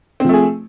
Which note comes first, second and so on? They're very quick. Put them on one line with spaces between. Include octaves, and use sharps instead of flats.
C4 F3 A3 G#4